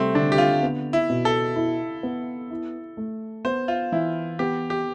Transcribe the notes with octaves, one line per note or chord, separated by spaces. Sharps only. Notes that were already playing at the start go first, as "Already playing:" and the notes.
Already playing: C3 G3 A3 C4
D3 D4
G4
F4
B3
E4
B2
A4
E4
B3
E4
A3
B3 C5
F4
E3 E4
B3 G4
G4